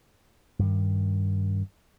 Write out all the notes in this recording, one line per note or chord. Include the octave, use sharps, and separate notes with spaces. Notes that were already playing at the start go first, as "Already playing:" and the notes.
G2 D#3